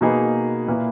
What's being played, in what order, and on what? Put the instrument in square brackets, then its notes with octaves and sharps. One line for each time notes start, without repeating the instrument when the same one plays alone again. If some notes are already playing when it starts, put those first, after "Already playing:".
[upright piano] B2 A#3 D#4 G#4 B4
A#2 A#3 E4 B4